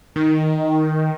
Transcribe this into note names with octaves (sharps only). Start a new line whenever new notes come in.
D#3